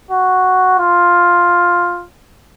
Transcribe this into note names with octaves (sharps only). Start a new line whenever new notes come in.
F#4
F4